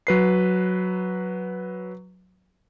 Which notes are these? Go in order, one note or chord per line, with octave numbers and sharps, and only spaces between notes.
F#3 B4 C7